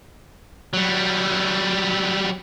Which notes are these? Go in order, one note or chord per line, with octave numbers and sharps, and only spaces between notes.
F#3 G3